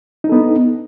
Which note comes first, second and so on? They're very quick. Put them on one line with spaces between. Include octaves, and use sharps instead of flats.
D#4 D4 A4 B3